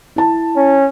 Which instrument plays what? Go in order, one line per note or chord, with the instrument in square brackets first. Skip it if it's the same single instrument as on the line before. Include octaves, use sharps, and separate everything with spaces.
[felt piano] E4 A5
[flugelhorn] C#4